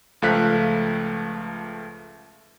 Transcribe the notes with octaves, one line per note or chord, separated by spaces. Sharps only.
C#2 F3 A3 F5 F#6 B6